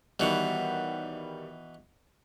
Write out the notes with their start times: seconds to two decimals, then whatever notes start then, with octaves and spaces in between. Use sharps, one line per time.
0.20 B2 D#3 E3 G3 G4 C#5 F#5